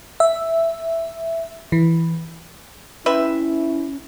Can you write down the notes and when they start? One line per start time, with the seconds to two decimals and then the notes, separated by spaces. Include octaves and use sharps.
0.20 E5
1.72 E3
3.06 C3 C#4 E4 B4 E5